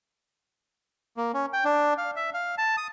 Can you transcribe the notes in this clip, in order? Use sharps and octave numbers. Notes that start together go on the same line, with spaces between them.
A#3
C#4
G5
D4
F5
E5
F5
A5
D#6